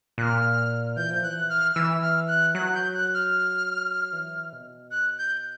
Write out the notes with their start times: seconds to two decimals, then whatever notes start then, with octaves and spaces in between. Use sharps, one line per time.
0.18 A#2 F#6
0.23 F6
0.97 E3 G6
1.11 F3
1.23 E3 F#6
1.50 F6
1.75 E3 E6
2.02 F6
2.28 F#6
2.55 F#3 F#6
2.75 G6
2.94 F#6
3.14 F6
4.13 E3
4.53 B2
4.91 F#6
5.18 G6